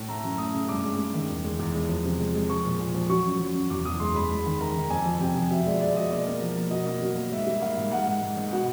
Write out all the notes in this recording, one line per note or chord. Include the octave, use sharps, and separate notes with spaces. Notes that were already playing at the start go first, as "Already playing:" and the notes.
Already playing: A2
A3 A#5
F#2
A3 D#6
C#3
G2 D6
G#3
G2
D#3
E2
G#3
E2
G#3
F3
C3
G#3
G#3
F3 C#6
A#2
A#2
F3
F#3 C#6
F#2
F#2
F#2
E2 D6
E2 D#6
G#3 C6
G#3 B5
G#3 B5
D#3
D#3 A#5
D#3
F2 G#5
F3
C3 G5
F3
B2 E5
G#3 D5
G#3 D5
B2 D#5
A#3 D5
A#3
F3
A#3
B2 D#5
A#3
F#3
A#3
G#2 E5
G3
A#3 F5
G#2
G#2 F#5
G#2
G#2
G#2
B2 F#5